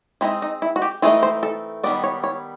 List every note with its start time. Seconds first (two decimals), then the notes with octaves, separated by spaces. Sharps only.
0.21 G#3 C4 D#4 E4
0.42 D#4
0.62 E4
0.76 F#4
0.82 G4
1.02 E3 A3 C4 D#4 G#4
1.23 C5
1.43 A4
1.83 D#3 G3 B3 D5
2.04 C#5
2.24 C#5